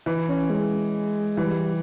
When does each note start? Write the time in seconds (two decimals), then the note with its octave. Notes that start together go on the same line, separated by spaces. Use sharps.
0.06 E3
0.29 C#4
0.50 G#3
1.37 E3 G3